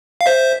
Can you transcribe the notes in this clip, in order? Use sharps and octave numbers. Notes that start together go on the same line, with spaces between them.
F5
C5 E5